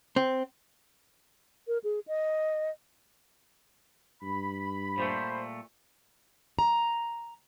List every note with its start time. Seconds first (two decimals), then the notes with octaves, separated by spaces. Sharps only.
0.16 C4
1.67 A#4
1.84 G#4
2.08 D#5
4.22 G2 B5
4.98 A#2 G3 A3 C5
6.59 A#5